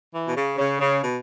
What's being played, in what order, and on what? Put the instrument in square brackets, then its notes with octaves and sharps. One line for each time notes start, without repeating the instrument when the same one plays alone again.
[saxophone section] E3
B2
C#3
C#3
C#3
B2